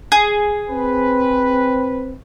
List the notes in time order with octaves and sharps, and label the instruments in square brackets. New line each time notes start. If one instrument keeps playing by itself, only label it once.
[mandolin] G#4
[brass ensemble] C4 B4